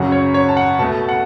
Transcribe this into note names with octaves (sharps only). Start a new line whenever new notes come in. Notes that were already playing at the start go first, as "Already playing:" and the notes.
Already playing: F#2 C#3 F#3 F#5
C#5
C#5
A5
F#5
B2 A3 A5
F#5